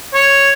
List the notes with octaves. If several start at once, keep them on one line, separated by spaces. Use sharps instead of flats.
C#5